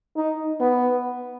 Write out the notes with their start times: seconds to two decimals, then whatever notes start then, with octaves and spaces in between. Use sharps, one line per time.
0.16 D#4
0.60 B3